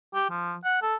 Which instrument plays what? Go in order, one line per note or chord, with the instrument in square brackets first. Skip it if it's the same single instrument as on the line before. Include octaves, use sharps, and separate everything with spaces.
[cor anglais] G4
F3
F#5
A4